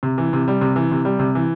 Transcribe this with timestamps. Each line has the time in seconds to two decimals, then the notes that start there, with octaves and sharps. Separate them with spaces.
0.03 C3
0.18 E3
0.33 C3
0.48 G3
0.61 C3
0.76 E3
0.91 C3
1.05 G3
1.19 C3
1.35 E3